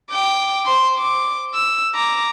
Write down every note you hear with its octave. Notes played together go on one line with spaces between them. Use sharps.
G5 D6
C5 C6
D6
E6
A#5 D6